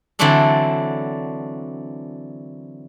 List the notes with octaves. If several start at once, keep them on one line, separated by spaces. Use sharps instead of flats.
D3 E3 F#3 C4 D4 A4